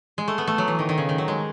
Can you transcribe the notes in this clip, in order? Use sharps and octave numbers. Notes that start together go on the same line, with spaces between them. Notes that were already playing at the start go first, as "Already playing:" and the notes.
G#3
A3
B3
A3
F#3
E3
D#3
D#3
C#3
D#3
F#3
G#3